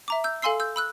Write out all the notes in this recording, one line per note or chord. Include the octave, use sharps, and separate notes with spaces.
E5 A#5 D6
E6 G6
A4 F5 G#5 C6 E6 C7
E6 G6
B5 E6 F#6